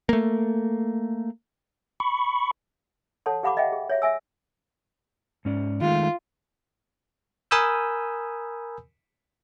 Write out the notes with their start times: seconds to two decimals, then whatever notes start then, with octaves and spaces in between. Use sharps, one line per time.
0.09 A3 A#3
2.00 B5 C#6
3.26 A4 C#5 F#5 A5 C6
3.43 G4 F5 F#5 B5 C#6 D6
3.57 D#5 E5 F#5 G5
3.72 G#4
3.90 C#5 E5
4.02 E5 G#5 E6
5.45 G#2 C#4 D5
5.81 D#3 G#3 A3 F4
7.51 A#4 G#5 B5 D#6 E6 G6